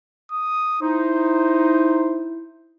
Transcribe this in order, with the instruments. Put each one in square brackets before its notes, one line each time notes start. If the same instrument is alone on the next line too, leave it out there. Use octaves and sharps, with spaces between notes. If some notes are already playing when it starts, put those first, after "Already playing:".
[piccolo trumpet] D#6
[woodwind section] D#4 [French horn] E4 [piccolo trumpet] C5